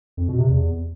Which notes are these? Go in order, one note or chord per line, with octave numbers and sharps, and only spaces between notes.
F2
B2
C3
E2